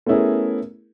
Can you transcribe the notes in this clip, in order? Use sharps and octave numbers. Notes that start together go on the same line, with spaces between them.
A3 B3 C#4 E4 G#4 A#4